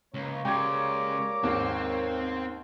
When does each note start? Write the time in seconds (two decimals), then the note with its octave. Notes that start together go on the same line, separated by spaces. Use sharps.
0.14 C#2 A#3 C#5
0.45 C#3 G3 G#3 G5 A#5 D6 G#6
1.44 D#2 G#2 C4